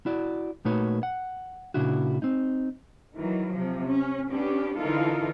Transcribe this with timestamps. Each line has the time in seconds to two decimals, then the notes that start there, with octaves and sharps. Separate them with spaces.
0.06 E4 F#4 D5
0.65 A#2 A3 D#4 F#4 B4 C#5
1.03 F#5
1.74 A#2 C#3 D4 E4 F#4
2.22 C4 D#4
3.15 D#3 E3 F#3
3.54 C3 F3
3.87 C#4
4.30 B3 C#4 D4 G4
4.77 D3 E3 D#4 F4 A4 A#4